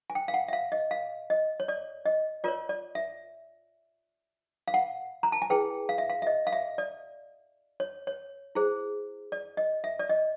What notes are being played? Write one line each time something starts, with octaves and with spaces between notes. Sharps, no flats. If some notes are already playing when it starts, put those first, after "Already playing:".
G#5
G5
F5
F#5
E5
F5
D#5
F5
D#5
C#5
D5
D#5
F4 A#4 C#5 D5
D5
E5
F5
F#5
A#5
A5
G#5
E4 G#4 B4 G5
F5
E5
F5
E5
D#5
F5
E5
D5
C#5
C#5
E4 G#4 C5
D5
D#5
E5
D5
D#5